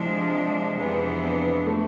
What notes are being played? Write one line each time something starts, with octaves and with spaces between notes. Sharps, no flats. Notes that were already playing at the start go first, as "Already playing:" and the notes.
Already playing: C3 F3 G#3 D4 E4
F2 C3 E3 G#3 B3 D4
A3